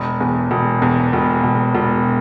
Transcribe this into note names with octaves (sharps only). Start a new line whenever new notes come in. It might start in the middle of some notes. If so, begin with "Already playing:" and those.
Already playing: E1
E2
E1
E2
E1
E1
E1